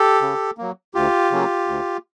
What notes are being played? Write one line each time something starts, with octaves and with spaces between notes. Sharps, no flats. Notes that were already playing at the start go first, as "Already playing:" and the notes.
Already playing: G4 A4
C#3
F#3 A#3
D2 F4 G4
C#3 F#3 A#3 C#4
D2